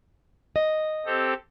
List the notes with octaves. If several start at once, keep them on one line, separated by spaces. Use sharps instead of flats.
D#5
C4 G4 A4